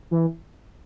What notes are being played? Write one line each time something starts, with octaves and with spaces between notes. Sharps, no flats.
E3